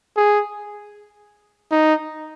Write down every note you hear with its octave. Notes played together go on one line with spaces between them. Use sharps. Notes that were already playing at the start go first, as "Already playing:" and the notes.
G#4
D#4